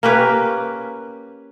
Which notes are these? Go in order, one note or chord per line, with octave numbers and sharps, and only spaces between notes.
A#3 C#4 G4 B4